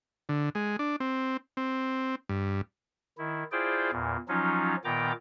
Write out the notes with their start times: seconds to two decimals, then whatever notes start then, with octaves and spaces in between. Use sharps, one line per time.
0.29 D3
0.55 G#3
0.79 D4
1.00 C4
1.57 C4
2.29 G2
3.18 D#3 E4
3.52 E4 F4 G#4 C5 D5 G5
3.92 E2 A#2
4.28 F3 F#3 C#4 D#4 F4
4.84 A#2 D#3 B3 G5 A#5 D6